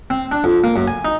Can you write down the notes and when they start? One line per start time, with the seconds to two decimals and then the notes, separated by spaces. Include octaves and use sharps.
0.10 C4
0.32 D4
0.44 F2
0.64 A#3
0.76 F#2
0.88 G#5
1.05 D#4